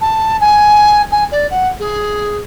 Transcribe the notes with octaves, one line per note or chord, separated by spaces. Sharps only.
A5
G#5
G#5
D5
F#5
G#4